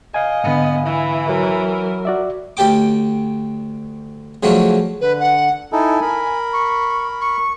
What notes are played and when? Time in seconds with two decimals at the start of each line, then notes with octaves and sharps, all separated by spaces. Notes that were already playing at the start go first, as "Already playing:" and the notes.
0.14 D#5 F5 G#5
0.44 G#2 D3 B3
0.86 E3 E4
1.29 F#3 A#4
2.05 F#4 D5 E5
2.57 D2 G4 A4 G5 D6
4.43 C#3 F3 F#3 A3 C#4 D4
5.01 D3 B4
5.20 F#5
5.72 D#4 E4 A4 G#5
6.02 A#4 B5
6.53 C#6
7.21 C#6